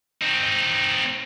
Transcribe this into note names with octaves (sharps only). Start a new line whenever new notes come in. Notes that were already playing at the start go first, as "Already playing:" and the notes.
C4 D#4